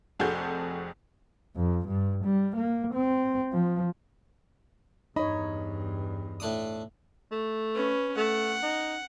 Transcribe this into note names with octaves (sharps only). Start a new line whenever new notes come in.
F1 F2 F#4 G#4 A4 G6
F2
G2
G3
A#3
C4
F3
E2 G2 D#4 C#5 D#5 B5
A2 D4 D#6
A3
C#4 B4
A3 F#5
D#4